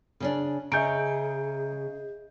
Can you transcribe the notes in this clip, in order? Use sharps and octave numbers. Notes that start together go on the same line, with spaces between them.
C#3 C#4 D4
C#3 G#4 D#5 E5 G#5 A#5 G6 D7